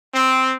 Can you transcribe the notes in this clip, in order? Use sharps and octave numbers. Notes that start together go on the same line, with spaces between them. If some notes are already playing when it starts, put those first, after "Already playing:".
C4